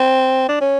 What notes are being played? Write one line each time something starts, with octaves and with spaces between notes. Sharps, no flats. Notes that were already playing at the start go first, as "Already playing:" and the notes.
Already playing: C4
D4
C#4